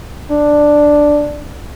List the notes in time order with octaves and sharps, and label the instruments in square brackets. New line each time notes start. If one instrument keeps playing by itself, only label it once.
[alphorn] D4